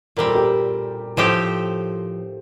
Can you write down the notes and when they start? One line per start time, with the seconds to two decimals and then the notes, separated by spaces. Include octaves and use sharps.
0.17 A#2 G3 C4 A#4
0.26 A4
0.35 G4 A#4
1.17 A2 F3 C4 G4 A4 C5